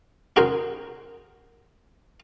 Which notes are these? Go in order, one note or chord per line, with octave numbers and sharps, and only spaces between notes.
C#4 D#4 F#4 G#4 A#4 C5